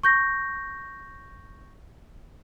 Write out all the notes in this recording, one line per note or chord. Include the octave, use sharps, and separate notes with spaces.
C#6 G6 A#6